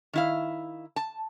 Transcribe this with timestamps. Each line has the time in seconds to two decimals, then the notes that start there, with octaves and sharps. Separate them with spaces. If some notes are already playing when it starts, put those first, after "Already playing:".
0.13 D#3 E4 F5
0.96 A5